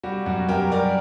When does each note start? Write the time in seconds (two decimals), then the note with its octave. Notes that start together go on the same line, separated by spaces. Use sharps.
0.03 G3 F#4
0.26 F#2 F#4
0.49 F#2 G4 A#4
0.71 G3 A#4 D5